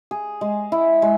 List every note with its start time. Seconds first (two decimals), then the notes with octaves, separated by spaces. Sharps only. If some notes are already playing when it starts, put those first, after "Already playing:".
0.11 G#4
0.41 G#3
0.72 E4
1.02 G#3